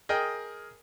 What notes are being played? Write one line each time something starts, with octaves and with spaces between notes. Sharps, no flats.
G#4 A#4 D#5 G5